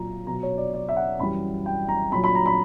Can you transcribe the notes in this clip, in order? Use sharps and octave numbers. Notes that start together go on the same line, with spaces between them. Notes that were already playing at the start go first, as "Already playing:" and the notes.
Already playing: A#2 F#3 A#5
B2 F#3 A#5
C#5
D5
D5
E5
F#5
F#2 E3 G3 B5
G5
A#5
A#2 F#3 B5
B5
A#5
B5